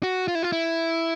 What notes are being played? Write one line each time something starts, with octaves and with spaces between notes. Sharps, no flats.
F#4
F4
E4
F4
E4